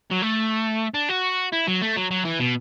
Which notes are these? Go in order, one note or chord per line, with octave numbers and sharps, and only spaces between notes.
F#3
A3
D4
F#4
E4
F#3
A3
F#3
F#3
E3
B2